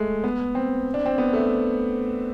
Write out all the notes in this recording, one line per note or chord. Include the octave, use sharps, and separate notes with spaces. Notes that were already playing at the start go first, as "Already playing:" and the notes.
Already playing: G#3 A3
B3
C4
D4
C4
B3
A3